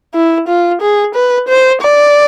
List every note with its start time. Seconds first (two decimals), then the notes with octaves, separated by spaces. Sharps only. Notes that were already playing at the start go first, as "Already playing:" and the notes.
0.14 E4
0.48 F4
0.81 G#4
1.15 B4
1.48 C5
1.81 D5